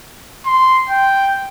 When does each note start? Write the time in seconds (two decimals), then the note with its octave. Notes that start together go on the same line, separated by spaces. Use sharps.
0.46 C6
0.89 G5